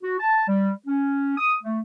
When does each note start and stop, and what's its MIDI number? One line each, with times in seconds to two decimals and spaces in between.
0.03 0.16 66
0.20 0.47 81
0.48 0.72 55
0.87 1.37 61
1.37 1.54 87
1.63 1.80 57